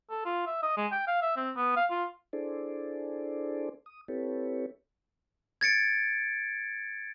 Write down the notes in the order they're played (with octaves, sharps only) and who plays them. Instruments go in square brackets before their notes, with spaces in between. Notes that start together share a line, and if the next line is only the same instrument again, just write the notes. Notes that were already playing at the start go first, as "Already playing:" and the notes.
[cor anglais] A4
F4
E5
D#5
G#3
G5
F5
E5
C4
B3
F5
F4
[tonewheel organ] D4 E4 G#4 A4 C5 D5
D#6
C4 E4 G4 A4 B4 C#5
[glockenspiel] G#6 A6 C#7 D7